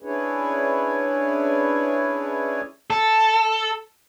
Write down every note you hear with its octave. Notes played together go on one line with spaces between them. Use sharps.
C#4 D4 E4 G#4 B4 C#5
A4